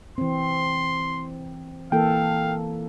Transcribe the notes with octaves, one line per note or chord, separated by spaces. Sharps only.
E3 C4 C6
E3 A#3 A4 F5 G5